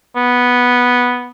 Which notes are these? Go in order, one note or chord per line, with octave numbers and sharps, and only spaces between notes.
B3